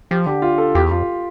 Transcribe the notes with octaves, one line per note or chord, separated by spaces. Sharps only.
F3 G4
D3 G4
F4
A4
E2 G4
F2 F4